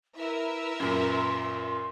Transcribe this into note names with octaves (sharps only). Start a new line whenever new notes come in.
E4 A#4 B4 E5
F#2 A#2 C6